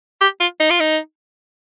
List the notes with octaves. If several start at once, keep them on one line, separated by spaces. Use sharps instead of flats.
G4
F4
D#4
F4
D#4